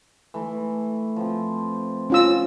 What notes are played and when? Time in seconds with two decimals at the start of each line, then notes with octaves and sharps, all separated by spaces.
0.34 E3 A3
1.16 F3 C4
2.10 C#4 F4 E6